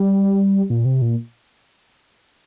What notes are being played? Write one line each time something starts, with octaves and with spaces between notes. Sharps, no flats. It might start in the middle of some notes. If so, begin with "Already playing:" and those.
Already playing: G3
A#2
C3
A#2